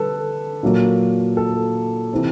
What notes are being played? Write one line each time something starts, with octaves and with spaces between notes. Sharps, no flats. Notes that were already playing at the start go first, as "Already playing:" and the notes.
Already playing: D3 G3 A4 B4
A#2 F#3 A#3
A4
C3 E3